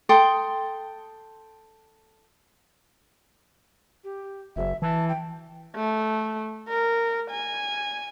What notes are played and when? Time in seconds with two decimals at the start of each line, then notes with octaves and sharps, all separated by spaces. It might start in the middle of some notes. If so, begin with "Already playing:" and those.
0.09 A4 G5 C6 D#6
4.04 G4
4.56 F#1 E5
4.82 E3 A5
5.09 G5
5.76 A3
6.68 A#4
7.30 G#5